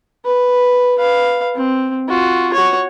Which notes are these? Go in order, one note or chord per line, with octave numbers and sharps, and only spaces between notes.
B4
B4 F5
C4
F4 F#4
F#4 C#5